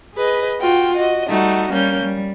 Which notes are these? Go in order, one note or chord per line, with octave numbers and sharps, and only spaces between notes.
G#4 B4 D#5
F4 F#4 G5
F#4 D#5
G3 A3 D#4 F#4
G3 A#3 C#4 G6
G3